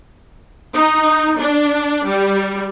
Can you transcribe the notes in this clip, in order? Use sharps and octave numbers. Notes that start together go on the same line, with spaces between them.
D#4
D4
G3